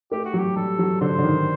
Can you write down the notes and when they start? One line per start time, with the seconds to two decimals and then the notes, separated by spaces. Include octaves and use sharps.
0.11 A3 G4
0.25 F#4
0.34 F#3 G4
0.56 G3 A4
0.79 F#3
1.01 D3 C5
1.18 D3
1.23 D#3